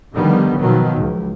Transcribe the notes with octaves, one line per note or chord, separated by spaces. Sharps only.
D3 D#3 F3 G3 B3
B2 D#3 F3 F#3
C#2